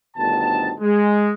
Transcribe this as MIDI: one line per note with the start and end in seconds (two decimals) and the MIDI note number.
0.16 0.72 31
0.16 0.72 38
0.16 0.72 47
0.16 0.72 51
0.16 0.72 81
0.80 1.31 56